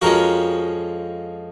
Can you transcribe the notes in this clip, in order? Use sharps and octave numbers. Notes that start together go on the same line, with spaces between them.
F2 F3 G#3 C#4 F#4 A#4